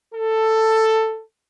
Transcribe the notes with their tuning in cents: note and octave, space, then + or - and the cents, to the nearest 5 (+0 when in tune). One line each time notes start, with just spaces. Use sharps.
A4 +10